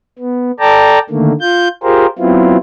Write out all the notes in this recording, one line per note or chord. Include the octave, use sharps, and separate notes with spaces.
B3
A4 D5 G5 A5 A#5
D3 D#3 A3 A#3
F4 G6
F4 G4 G#4 A#4 C5
F#3 B3 C4 E4 F4